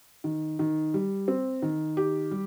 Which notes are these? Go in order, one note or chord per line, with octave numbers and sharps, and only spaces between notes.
D#3
D#3
G3
C4
D#3
G4
G3